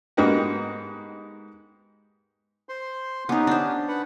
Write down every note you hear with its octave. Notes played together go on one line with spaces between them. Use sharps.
G#2 A#3 B3 D#4 F#4 G4
C5 C6
B3 C#4 D#4 G4
D4 C5
B4 F#5